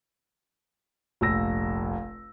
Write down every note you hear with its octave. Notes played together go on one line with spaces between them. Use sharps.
F1 A#1 E6 A#6